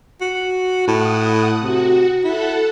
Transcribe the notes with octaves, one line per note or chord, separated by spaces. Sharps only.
F#4
A2 F#5 D#6
C3 F#4
E4 A4 F#5